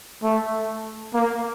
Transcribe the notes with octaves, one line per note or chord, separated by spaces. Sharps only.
A3
A#3